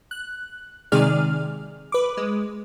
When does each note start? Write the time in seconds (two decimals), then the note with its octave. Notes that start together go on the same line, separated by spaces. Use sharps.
0.11 F#6
0.92 C3 D#3 G#3 G#4 D5 F6
1.92 B4 D6
2.17 G#3